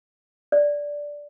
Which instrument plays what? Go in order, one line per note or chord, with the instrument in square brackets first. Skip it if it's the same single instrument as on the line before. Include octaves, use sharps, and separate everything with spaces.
[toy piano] D5